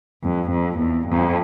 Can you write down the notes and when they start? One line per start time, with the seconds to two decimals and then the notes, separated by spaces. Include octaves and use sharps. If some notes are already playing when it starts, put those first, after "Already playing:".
0.24 F2
0.51 F2
0.79 E2
1.08 F2